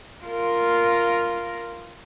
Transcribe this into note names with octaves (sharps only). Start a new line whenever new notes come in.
F4 A#4